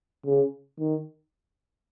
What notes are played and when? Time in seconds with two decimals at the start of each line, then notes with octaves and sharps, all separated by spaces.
0.26 C#3
0.79 D#3